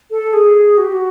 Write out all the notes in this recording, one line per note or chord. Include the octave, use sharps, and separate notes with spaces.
A4
G#4
F#4
G4
F#4